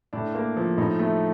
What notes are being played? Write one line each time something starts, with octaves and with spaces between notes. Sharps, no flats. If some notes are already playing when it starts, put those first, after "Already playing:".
A2 D4
A#3
F3
A2 D#4
A3